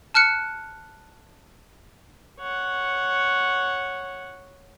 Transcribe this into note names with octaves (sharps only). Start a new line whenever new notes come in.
A5 F6 F#6 C#7
C#5 F#5